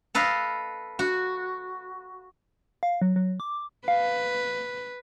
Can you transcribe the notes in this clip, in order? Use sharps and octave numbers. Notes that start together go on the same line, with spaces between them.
A4 B4 D#5 F5
F#4
F5
F#3
F#3
D6
B4 F5